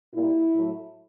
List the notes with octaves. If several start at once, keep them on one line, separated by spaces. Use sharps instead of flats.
A#2 G3 A#3 E4
A2 F#3 A3